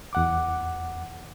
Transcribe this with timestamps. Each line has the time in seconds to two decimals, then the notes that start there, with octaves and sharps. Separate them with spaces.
0.13 E2 F#5 D6